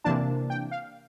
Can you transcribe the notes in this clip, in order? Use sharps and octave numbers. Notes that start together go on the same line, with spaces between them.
C3 E3 A#3 D4 A5
G5
F5